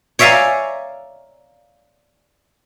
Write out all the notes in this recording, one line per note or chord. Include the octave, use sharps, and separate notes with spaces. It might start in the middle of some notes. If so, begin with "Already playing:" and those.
C#5 D5 E5 F5 G#5 A#5